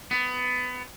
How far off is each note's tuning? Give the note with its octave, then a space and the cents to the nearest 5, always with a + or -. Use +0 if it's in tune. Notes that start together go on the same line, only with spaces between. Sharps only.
B3 +20